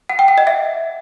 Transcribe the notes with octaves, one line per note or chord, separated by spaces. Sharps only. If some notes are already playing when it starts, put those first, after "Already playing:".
F#5
G5
F#5
D#5
E5